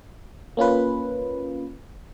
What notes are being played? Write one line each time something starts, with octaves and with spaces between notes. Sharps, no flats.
A#3 C#4 F4 B4